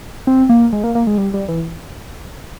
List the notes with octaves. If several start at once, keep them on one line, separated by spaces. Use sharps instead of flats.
C4
A#3
G#3
A#3
A#3
G#3
G3
G3
E3